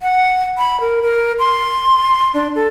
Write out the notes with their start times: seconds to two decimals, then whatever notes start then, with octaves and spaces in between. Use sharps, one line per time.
0.02 F#5
0.58 B5
0.81 A#4
1.02 A#4
1.39 C6
2.34 D4
2.55 A4